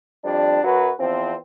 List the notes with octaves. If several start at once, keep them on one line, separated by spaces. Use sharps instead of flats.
F2 G3 D4
F#2 F#3 F#4 B4
E2 F3 C4